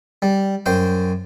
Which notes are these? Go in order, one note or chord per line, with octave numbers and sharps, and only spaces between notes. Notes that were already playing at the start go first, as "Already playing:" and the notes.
G3
F#2 C5 G5